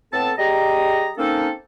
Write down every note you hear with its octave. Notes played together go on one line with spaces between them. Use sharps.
A2 B3 C4 A4 A5
G3 G4 G#4 D#5 A#5
A#3 C4 C#4 D#4 A4